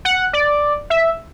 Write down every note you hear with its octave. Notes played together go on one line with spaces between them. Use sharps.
F#5
D5
E5